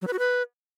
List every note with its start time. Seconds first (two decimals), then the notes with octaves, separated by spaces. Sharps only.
0.02 F#3
0.07 B4
0.13 F#4
0.19 B4